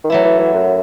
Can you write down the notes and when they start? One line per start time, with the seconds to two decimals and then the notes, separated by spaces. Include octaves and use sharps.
0.04 D#3
0.10 E3 F#3 A3 E4
0.24 E3
0.39 E3
0.53 F#2